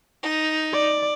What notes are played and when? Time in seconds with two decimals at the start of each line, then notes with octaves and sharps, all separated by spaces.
0.23 D#4
0.74 D5